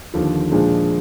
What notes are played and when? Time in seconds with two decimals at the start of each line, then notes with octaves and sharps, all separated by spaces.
0.14 D#2 D3 F3
0.52 A#2 F3 G#3 D4 G#4